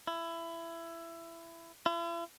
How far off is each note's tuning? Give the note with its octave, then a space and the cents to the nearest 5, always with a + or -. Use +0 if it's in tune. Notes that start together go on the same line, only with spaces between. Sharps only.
E4 +20
E4 +45